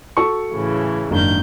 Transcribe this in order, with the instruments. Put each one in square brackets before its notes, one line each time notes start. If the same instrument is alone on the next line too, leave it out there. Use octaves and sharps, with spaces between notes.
[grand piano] F#4 A4 C#6
[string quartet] A2 C#3 E3
[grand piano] F#1 D4 [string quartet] G#2 D#3 G6